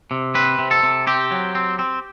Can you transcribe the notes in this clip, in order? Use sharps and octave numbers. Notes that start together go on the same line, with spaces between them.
C3
C4 B4
C3
A4
C3
C4 G4
F#3
C4
C4